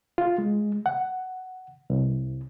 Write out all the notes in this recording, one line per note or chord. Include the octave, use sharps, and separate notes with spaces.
F4
G#3
F#5
C2